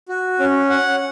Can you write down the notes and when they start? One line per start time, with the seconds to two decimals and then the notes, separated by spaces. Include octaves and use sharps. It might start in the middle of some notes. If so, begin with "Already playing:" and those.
0.09 F#4
0.39 C#4
0.70 F#5